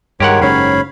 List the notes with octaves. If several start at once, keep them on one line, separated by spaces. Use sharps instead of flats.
G2 D#3 G#3 G4 A#4 C#5 F#5
F#1 G#2 C#4 C#5 F5 B5